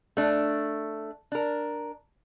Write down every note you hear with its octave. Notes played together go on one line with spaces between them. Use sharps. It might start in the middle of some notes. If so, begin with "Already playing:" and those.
A3 D4
D4 A#4